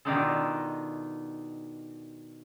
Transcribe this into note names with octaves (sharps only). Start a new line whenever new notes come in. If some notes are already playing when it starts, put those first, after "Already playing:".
B2 D#3 D4 D#4 F4 A4